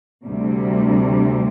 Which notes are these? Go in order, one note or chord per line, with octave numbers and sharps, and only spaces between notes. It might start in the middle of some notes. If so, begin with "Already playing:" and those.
D2 C3 G3